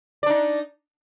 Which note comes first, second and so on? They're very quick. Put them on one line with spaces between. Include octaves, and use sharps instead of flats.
D5 D4 D#4